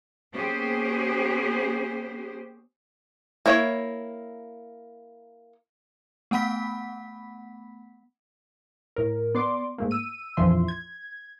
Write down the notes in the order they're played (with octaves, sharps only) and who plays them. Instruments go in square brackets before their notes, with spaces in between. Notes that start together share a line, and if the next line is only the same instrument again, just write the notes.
[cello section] A#3 B3 C#4 G4 G#4 C5
[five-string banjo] A#3 E4 C#5
[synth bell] A3 B3 F#5 B5 B6
[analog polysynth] A2 A#4
B3 D5 C6 D6
G#2 A3 A#3
E6 D#7
A#1 F2 E3 F3 E5 C6
G#6